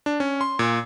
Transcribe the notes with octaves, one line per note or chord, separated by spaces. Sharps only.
D4
C#4
C6
A#2